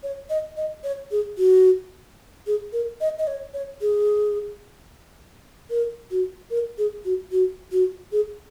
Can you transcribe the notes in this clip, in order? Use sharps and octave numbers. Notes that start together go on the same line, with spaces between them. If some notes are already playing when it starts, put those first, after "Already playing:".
C#5
D#5
D#5
C#5
G#4
F#4
G#4
A#4
D#5
D#5
C#5
C#5
G#4
A#4
F#4
A#4
G#4
F#4
F#4
F#4
G#4